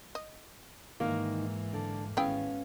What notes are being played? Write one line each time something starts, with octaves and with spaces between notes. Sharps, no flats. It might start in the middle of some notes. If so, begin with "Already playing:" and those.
D#5
G#2 D#3 E3 A#3 D#4
D3
G#1 B3 C#4 E4 G#4 F5 G5